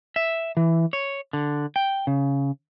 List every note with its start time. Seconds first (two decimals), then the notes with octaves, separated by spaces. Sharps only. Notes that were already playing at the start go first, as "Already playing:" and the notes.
0.16 E5
0.57 E3
0.93 C#5
1.33 D3
1.76 G5
2.07 C#3